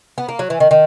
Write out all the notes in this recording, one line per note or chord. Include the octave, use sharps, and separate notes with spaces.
B3
A#3
F#3
E3
D#3
D#3